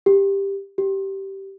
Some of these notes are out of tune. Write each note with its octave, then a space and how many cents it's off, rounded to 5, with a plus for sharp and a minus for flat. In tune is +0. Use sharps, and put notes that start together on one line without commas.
G4 +10
G4 -15